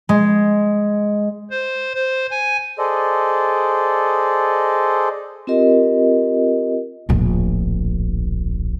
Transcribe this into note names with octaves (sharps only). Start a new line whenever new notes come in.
G#3
C5
C5
G#5
G#4 A4 C5 D5 D#5
C4 F4 G4 A#4 D#5
D1 A#1